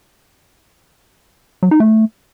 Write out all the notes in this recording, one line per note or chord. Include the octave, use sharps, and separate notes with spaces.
F#3
D#4
A3